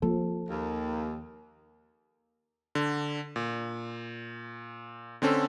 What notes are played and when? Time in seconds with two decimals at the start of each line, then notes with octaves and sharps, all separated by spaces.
0.02 F3 A#3 C4 A4
0.49 D#2
2.75 D3
3.36 A#2
5.22 D3 C4 C#4 A4